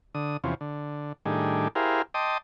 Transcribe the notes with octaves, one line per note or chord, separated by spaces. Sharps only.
D3 D#6
E2 C3 F3 C#4
D3
A2 D#3 G3 D4 G#4
E4 G4 G#4 A#4 C5 F5
D#5 G5 A5 C6 D6 D#6